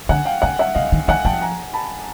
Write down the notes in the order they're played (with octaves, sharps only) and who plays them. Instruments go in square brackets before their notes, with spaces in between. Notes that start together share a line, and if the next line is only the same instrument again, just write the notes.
[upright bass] D3 [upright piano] F#5 G#5
[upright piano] F5 G5
[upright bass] D3 [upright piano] F#5 G#5
[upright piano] E5 F#5
[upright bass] C#3 [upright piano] D#5 F5
[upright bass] D#3
[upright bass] D#3 [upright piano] F#5 G#5
[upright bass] F3 [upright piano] G5 A5
[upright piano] G#5 A#5
A5 B5